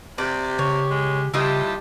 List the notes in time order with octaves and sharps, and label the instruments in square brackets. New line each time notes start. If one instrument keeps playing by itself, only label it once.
[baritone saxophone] C3 [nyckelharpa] G4 [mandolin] D5
[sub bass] C#3 [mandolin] C#5
[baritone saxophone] G#3
[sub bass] C#3 [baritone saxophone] G3 [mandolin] E4 F4 D#5 [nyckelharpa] G4 A5